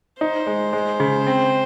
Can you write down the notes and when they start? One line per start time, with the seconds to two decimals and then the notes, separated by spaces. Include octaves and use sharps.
0.20 D#4 C5
0.47 G#3
0.73 G#3
1.00 C#3
1.27 C4